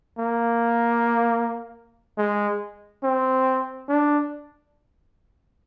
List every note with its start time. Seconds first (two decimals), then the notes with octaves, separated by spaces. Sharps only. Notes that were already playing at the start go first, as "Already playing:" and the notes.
0.19 A#3
2.18 G#3
3.03 C4
3.89 D4